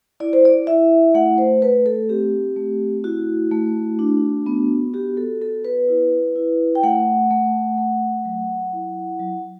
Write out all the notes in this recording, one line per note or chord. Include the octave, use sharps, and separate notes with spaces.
E4 D5
C5
D5
E4 E5
A3 F#5
C5
A3 B4
A4
C4 G4
A3
E4 F#4
A3
D4
B3
F#4 G4
A4
B3 A4
B4
E4
E4
G5
A3 F#5
A3
A3
F#3
E4
F#3